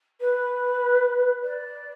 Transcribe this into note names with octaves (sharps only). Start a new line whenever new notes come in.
B4
D5